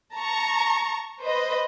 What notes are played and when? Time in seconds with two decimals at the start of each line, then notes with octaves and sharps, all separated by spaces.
0.14 A5 A#5 C#6
1.23 B4 C5 D#5